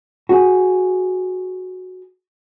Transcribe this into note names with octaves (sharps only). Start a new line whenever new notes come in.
F#4 G#4